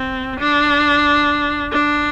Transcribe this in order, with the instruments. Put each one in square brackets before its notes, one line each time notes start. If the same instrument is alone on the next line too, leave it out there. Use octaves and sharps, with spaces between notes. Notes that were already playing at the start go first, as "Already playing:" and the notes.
Already playing: [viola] C4
D4
D4